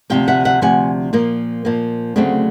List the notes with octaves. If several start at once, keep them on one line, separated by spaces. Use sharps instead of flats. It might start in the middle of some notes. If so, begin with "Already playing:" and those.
D2 C3 F3 F5 G5
E5 F#5
E5 F#5
D2 C3 F3 F#5 G#5
A#2 F3 A#3
A#2 F3 A#3
D2 C#3 F#3 A3 C4